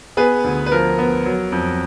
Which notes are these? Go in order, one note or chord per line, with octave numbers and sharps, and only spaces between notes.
B3 G#4 B4
D2
B4
F3 A#4
B3
F#3
F2